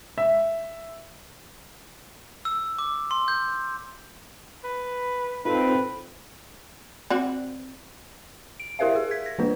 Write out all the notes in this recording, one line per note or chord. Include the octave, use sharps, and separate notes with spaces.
E5
E6
D6
C6
G6
B4
C4 D#4 F4 A4 B4
C4 F#4 D5
D7
E4 G4 A#4 C5 E5 F5
G#4
G#6 B6
A#6
E3 A#3 D4 F4 B4